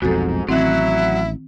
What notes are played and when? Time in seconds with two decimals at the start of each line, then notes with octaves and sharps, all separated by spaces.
0.02 F1 B1 F2 G#2 F#4 A4
0.49 A1 D#3 F#3 C4 E4